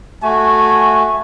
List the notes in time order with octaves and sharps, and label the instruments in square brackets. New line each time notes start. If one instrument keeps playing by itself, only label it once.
[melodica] A3 [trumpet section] F#4 G#5